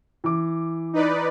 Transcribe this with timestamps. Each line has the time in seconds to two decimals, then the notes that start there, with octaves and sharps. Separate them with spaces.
0.24 E3 D6
0.93 D#4 B4 D5